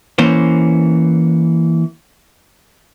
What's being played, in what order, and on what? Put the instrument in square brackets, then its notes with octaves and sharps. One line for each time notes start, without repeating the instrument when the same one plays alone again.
[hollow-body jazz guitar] E3 A#3 C#4 C5